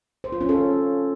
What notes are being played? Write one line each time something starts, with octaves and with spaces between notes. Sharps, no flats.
C5
F4
C#4
A4